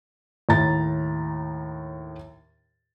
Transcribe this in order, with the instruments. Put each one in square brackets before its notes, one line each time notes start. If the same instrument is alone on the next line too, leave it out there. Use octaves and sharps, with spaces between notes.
[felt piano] D#2 A2 A#5 A6